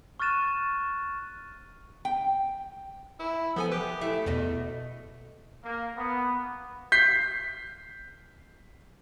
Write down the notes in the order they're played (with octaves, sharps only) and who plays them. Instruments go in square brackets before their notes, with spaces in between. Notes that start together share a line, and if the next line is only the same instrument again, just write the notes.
[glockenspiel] C#6 F6 F#6 A6 D#7 E7
[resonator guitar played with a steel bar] G5
[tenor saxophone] E4
[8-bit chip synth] F3 A4 G#5 [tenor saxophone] B3
[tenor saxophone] G4 [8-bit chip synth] B4
[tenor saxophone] A3 [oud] E4 [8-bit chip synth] E5
[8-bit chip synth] E2 [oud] B2 F#4 D#5
[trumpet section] A#3
B3
[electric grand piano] G6 B6 C7